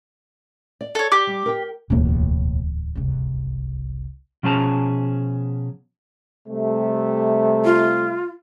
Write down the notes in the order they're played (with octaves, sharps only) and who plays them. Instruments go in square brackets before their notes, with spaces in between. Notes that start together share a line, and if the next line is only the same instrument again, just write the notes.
[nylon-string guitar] D5
[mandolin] A4 C#5
[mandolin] G4 [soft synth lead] D6
[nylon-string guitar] G3
A#4 G5
[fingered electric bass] D1 E2 A#3 [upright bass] B1 A2
[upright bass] F#1 C2
[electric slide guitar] B2 F3 C#4 G#4 A5 A#5
[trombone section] C3 G3 A3
[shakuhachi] F4